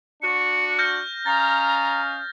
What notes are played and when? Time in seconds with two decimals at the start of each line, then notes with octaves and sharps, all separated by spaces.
0.22 D4 F#4 C#7
0.79 F6 G6 A#6
1.26 C#4 D#5 F5 A#5 A6